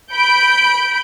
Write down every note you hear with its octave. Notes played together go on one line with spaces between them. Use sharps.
B5 G6 D7